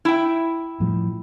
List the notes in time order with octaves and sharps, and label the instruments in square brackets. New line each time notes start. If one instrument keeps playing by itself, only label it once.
[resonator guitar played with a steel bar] E4 G5
[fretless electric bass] A2 F3 G3